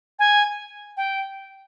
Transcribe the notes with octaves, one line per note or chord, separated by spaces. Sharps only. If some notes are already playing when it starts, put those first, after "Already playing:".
G#5
G5